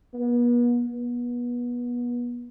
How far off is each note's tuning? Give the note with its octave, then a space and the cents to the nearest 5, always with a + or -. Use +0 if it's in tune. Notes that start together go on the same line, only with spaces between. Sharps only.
B3 -40
B3 -30